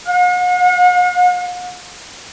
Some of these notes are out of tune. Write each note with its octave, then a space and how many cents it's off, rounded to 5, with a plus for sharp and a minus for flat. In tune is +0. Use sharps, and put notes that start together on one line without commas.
F#5 -45